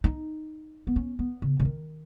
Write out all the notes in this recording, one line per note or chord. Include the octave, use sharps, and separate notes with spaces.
D#4
B3
C#4
B3
C#3
C#3
D#3